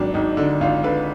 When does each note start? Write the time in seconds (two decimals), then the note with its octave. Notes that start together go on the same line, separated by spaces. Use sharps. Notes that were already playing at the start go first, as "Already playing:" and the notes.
Already playing: G#1 F#3 D4
0.14 G#1 D#4
0.37 D3
0.61 G#1 F4
0.84 D3 B4